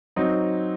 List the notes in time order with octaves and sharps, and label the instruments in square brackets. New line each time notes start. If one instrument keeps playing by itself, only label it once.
[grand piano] F#3 C4 D#4